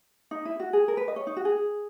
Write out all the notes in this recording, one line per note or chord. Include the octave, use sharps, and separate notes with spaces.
D#4
E4
F#4
G#4
A#4
B4
D#5
C#5
D#4
F#4
G#4